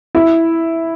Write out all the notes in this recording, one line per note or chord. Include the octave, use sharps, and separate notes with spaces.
E4